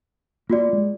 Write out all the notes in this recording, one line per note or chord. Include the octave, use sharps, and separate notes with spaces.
A#3 F4 F#4 D5
G#3